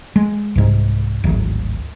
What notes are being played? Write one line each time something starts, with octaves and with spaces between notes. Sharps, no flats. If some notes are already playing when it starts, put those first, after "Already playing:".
G#3
C2 G#2
D1 G#1